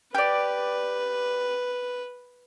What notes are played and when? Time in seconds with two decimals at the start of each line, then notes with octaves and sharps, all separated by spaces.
0.14 G4 B4 D5